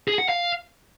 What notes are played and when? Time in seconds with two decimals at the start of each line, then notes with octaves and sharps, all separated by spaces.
0.08 G#4
0.18 F#5
0.29 F5